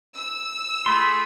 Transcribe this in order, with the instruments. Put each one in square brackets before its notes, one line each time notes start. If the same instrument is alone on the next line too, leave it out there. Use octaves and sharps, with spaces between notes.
[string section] E6
[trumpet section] A3 F4 B5 [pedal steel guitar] G#4 C6